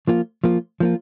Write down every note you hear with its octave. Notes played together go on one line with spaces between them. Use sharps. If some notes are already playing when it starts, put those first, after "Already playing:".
F3 A#3 F4
F3 A#3 F4
F3 A#3 F4